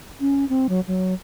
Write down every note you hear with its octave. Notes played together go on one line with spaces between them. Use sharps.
C#4
C4
F#3
F#3